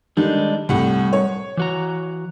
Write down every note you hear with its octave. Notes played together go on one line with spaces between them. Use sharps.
D3 D#3 G3 G#3 D4 D#4
C2 A2 G3 F#5
C#5
E3 F#4 A#5